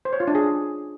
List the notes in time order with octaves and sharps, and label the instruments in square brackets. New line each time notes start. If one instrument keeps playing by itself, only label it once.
[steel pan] C5
C#5
F4
D4
G#4